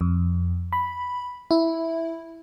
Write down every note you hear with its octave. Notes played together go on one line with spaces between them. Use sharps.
F2
B5
E4